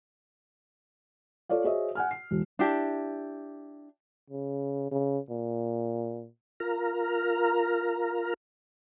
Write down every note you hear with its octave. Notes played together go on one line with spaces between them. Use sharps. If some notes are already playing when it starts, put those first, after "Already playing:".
F4 A4 C#5 D5 F5
F#4 G#4 C5 C#5 D#5 E5
F#5 G#5 F6
C7
E1
D4 E4 G4
C#3
C#3
A#2
F4 A#4 A#5 F6